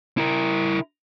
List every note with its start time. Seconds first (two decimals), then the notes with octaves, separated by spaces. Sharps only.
0.18 E4 A#4